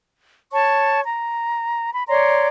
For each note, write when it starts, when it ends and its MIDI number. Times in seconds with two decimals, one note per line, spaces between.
0.52 1.02 73
0.52 1.02 81
0.52 1.02 85
1.05 1.92 82
1.94 2.04 83
2.08 2.48 73
2.08 2.48 74
2.08 2.48 82
2.08 2.48 84